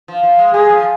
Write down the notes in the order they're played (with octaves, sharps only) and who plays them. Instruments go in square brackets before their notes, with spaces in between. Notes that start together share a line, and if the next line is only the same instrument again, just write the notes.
[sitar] F3
F3
G#3
[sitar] G#3 [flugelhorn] G#4
[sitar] F3